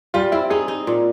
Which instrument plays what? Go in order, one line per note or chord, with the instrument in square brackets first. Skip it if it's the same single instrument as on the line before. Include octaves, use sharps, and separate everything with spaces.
[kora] G3 [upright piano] F4
[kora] C4 [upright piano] E4
[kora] D#4 [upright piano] G#4
[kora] D#4
A#2